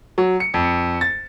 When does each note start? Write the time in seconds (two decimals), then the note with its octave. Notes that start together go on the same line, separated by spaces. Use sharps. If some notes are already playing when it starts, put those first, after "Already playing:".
0.18 F#3
0.40 C#7
0.54 F2
1.01 A6